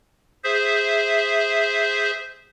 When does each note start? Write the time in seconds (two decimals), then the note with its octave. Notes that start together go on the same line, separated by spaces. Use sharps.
0.44 G#4 C5 E5